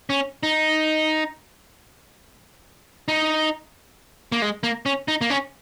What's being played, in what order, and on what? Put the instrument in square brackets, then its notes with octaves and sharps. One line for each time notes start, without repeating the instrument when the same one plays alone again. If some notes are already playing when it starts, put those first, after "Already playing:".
[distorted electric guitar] C#4
D#4
D#4
A#3
G#3
A#3
C#4
D#4
A#3
C#4